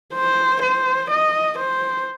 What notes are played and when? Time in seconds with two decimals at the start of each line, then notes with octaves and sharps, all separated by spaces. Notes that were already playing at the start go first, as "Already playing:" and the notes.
0.14 C5
0.63 C5
1.11 D#5
1.59 C5